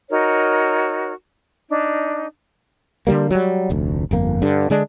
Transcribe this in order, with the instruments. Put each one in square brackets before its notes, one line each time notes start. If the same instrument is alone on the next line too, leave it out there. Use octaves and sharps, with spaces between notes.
[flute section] D#4 F#4 A#4 C#5
D4 D#4
[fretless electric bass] D3 D#3 G3 A#3
F#3 G3
F1 D2
G1 F2 A#3
G2 D3
D3 G#3 D4